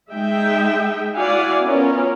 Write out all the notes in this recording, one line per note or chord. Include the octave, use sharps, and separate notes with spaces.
G#3 D#4 E5 G5
E4 F#4 D5 F5 F#5 G#5
B3 C#4 F4 A#4